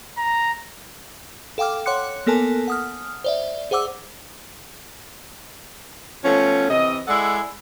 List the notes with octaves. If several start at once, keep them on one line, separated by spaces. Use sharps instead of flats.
A#5
A4 F5 G5 D6 F6
C#5 F#5 C6 D6 F#6 C#7
A#3 B3 A4 A#4 G#5 A5
F#5 D#6 F6
C5 D5 E5
G#4 C5 F#5 D6 E6
F3 A3 B3 C#4
C3 E3 D#5
G#3 E4 A4 D5 F#5